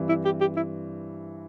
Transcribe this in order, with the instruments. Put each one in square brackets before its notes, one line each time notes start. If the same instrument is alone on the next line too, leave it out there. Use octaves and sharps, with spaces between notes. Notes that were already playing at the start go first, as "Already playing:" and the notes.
Already playing: [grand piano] G2 E3 G3 C4
[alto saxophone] E4
G4
G4
E4